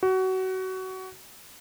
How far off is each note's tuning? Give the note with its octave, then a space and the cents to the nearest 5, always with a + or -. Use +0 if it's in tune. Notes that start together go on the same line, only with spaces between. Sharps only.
F#4 +25